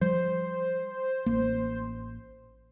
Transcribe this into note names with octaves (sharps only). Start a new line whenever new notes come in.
F3 G3 C5
A1 A#3